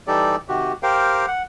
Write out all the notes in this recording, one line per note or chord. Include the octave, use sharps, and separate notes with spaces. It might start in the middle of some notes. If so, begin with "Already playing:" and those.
E3 G3 D#4 G4 A4 D5
C3 D#3 F#4 G4
G4 A#4 C5 F5 G5
F#5